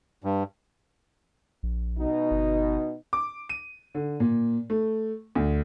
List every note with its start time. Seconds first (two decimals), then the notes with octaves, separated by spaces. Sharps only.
0.24 G2
1.63 A#1
1.98 B2 D#4
2.31 G1
3.13 D6
3.49 D#7
3.95 D3
4.20 A#2
4.70 A3
5.35 D2